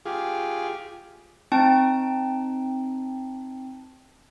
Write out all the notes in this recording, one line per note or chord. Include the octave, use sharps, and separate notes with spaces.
F4 G4 G#4
C4 D#4 G5 A5